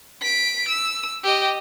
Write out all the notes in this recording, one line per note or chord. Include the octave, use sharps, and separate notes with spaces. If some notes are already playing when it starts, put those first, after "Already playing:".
B6 D7
E6
G4 D#5